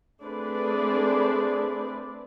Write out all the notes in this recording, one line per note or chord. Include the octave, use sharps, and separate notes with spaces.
A3 C4 D4 G#4 B4 D5